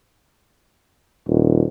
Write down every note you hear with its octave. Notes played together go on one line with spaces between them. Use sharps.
D#1